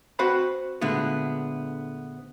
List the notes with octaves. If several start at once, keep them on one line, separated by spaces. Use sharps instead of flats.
C4 F#4 B4 C5 F#5 B5
A#2 D3 G#3 A3 B3